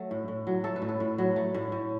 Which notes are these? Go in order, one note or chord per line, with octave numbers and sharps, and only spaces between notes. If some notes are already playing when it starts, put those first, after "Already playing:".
Already playing: F#3 A3
A2
A2
F#3
A3 A4
B4
A2
A4
A2
F#3
A3
A2
A2